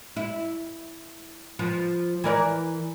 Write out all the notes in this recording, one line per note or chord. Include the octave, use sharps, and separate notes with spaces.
E4
F3 B4
E3 A#4 D5